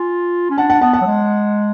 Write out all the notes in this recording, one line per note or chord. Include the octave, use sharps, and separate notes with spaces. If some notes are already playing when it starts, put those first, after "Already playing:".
Already playing: F4 G#5
C#4
D4 F#5 A5
F#5 A5
B3 F#5 A5
F#5 A5
F#3
G#3